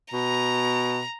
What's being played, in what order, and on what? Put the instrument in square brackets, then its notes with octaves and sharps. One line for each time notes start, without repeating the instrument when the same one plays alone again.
[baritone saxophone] B2 [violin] A#5